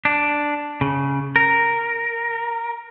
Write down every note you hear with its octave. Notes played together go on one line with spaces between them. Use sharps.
D4
C#3
A#4